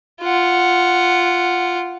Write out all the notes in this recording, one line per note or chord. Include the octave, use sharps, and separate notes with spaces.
F4 F#5